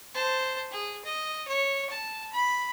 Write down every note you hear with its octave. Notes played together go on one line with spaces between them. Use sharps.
C5 A5
G#4
D#5
C#5
A5
B5